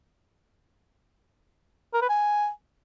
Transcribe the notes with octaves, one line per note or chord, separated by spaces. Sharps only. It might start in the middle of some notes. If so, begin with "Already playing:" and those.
A#4
B4
G#5